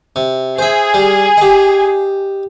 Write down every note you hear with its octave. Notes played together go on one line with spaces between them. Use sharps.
C3
G#4 C5 E5
G3
G4 D#5